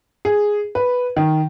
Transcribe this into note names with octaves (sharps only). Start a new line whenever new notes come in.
G#4
B4
D#3